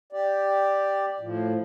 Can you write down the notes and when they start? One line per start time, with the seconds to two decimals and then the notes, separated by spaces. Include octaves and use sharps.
0.13 G4 D5
1.20 A2 F3